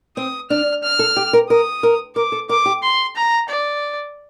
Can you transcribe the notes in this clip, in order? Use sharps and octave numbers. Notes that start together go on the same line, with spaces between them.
C4 D#6
D4 F6
F6
A4
G4
A#4
A#4 D#6
A#4
A#4 D6
A4
A#4 D6
G4
C6
A#5
D5